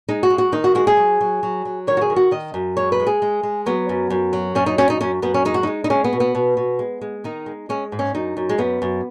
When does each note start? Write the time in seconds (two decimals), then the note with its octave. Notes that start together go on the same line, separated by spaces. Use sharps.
0.08 G#3 D#4
0.23 F#4
0.30 G#3
0.38 F#4
0.52 D#3 D#4
0.64 F#4
0.75 G#3 F#4
0.87 G#4
0.97 F#3
1.21 F#3
1.43 F#3
1.65 F#3
1.87 D#3 C#5
1.97 F#4
2.01 G#4
2.10 D#3
2.16 F#4
2.31 D#3 D#5
2.54 F#2
2.77 G#3 C#5
2.92 B4
3.00 G#3
3.07 G#4
3.22 G#3
3.43 G#3
3.66 F#3 B3
3.89 F#2
4.10 F#2
4.33 F#3
4.55 F#2 C#4
4.66 D#4
4.78 F#2 C#4
4.90 D#4
5.01 F#2 C#4
5.22 F#2 B3
5.34 C#4
5.45 G#3 D#4
5.54 F#4
5.63 G#3 D#4
5.84 D#4
5.90 G#3 C#4
6.04 B3
6.13 B2
6.20 B3
6.35 B2
6.57 B2
6.79 G#3
7.01 G#3
7.24 D#3 D#4
7.46 G#3
7.69 G#3 C#4
7.92 G#2
7.99 C#4
8.14 F#2 D#4
8.37 F#2
8.49 G#3
8.58 F#2 B3
8.82 F#2